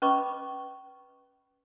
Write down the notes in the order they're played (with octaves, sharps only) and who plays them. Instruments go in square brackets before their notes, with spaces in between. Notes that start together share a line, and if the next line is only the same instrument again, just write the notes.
[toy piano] C#4 B4 D#5 B5 C#6 D6